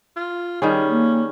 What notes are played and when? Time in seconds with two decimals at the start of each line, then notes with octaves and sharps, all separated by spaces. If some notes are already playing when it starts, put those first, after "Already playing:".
0.17 F4
0.62 D#3 G3 C#4 G#4
0.88 A#3